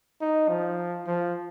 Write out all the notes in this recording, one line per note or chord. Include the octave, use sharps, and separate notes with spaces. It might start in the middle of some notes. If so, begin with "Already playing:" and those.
D#4
F3
F3